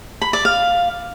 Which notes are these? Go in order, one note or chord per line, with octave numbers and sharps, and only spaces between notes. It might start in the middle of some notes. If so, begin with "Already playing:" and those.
B5
D5
F5